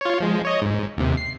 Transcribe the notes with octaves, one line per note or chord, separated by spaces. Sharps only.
F4 C#5
F3 G#3
C#5 D#5
G#2
D#2 C3
C7